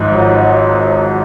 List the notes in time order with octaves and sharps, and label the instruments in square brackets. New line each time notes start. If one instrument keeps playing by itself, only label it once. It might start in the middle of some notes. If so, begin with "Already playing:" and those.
Already playing: [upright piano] G#1 G#2 F3
[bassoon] F#3
F#3